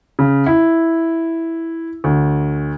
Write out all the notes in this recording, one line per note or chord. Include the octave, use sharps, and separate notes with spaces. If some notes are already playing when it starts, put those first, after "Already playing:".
C#3
E4
D2